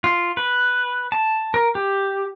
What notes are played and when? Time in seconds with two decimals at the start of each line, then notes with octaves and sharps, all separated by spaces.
0.04 F4
0.37 B4
1.12 A5
1.54 A#4
1.75 G4